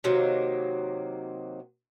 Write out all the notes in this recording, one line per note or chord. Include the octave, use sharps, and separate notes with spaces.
C3 D#3 F#3 A#3